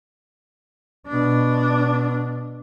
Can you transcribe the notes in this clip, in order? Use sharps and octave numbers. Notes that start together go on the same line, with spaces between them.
B2 D4